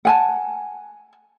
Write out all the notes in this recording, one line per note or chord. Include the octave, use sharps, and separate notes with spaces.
F#5 G#5 A5